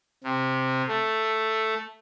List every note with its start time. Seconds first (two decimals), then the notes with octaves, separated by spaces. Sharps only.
0.24 C3
0.88 A3